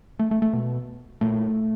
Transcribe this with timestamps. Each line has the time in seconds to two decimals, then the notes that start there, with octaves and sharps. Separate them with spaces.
0.19 A3
0.31 A3
0.42 A3
0.53 B2
1.21 A#2 A3